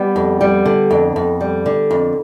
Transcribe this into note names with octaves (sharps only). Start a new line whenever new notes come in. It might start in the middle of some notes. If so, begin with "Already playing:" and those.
Already playing: G3 B3
F2
G3
D3
F2
F2
G3
D3
F2